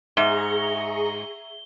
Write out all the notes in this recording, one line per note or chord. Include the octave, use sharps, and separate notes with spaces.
G#2 G#4 E5 A#5 C#6 G7